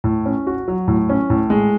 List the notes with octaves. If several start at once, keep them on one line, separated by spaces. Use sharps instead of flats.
A2
C#4
F#4
F#3
A2
C#4
A2
G#3